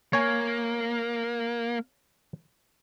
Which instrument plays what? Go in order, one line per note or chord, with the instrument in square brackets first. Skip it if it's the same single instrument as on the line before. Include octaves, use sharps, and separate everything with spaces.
[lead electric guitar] A#3 [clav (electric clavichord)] C#5 G#5